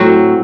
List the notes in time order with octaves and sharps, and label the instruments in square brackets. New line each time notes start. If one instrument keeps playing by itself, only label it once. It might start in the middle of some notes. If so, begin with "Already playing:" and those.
Already playing: [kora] A2 F#3 C4 F#4